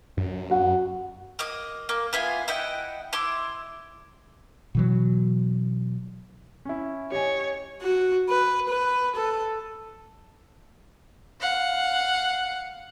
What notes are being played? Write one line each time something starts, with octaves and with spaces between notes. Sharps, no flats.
F#2
F#4 F#5
A#3 D#5 D#6
A#3
B3 E4 F4 G#5
E4 D#5 F#5 G5
E4 C6 D6
B2 E3 F#3
C#4 E4
G4 C#5 D#5 G#5
F#4
B4
B4
A4
F5 F#5